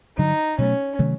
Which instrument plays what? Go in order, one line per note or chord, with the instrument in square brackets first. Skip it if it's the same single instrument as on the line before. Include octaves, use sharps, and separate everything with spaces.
[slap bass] G2 D3 F#3 [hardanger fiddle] D#4
[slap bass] B2 F#3 A3 [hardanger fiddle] C#4
[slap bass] C3 D#3 F#3 A3